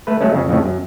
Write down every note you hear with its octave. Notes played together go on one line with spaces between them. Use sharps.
A3 B4
F#3 G#3 A3 C#4
F2 C#3
F2 A2 C#3
F#2